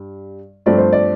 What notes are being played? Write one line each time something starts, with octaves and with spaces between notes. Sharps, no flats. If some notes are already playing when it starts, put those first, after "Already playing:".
Already playing: G2
G2 F3 A3 C4 D5
C5
D5